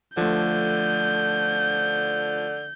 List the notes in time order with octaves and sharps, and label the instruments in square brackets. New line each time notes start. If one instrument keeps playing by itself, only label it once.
[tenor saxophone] D3 [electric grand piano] F3 A3 [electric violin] G6